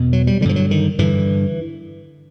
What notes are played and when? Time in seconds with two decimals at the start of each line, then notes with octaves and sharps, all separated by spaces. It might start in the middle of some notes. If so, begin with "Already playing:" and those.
Already playing: E2 B2
0.13 F#3
0.27 G3
0.41 D3 G3
0.45 G2 F3
0.56 F#3
0.71 D#3
0.99 G2 D3 E3